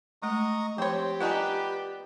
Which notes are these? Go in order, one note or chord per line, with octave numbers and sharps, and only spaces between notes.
G#3 A3 D#5 A#5 C#6
F3 C4 G4 C5 C#5 B5
B3 D4 D#4 F4 B4 G#5